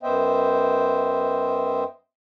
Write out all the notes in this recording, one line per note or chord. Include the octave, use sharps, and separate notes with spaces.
F#2 B3 C5 D#5 E5 G5